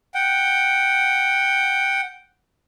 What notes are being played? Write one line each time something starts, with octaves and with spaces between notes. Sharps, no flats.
F#5 G5